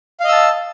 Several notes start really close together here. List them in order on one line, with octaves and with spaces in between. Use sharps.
F5 D#5 E6 A5